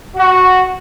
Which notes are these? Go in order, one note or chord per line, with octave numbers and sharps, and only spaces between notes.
F#4